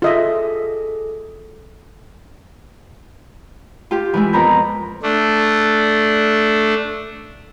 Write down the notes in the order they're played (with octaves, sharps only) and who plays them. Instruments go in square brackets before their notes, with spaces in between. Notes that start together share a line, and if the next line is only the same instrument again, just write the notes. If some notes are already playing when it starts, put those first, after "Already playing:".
[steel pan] F4 D#5 E5 [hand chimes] G#4 A4
[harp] F4 G4
E3 G#3 E4
F2 B3 A#4 A#5 B5 G6
[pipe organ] A3 D4